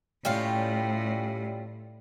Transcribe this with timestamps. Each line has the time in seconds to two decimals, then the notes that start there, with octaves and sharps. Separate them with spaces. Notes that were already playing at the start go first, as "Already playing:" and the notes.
0.25 A2 G3 C#4 F4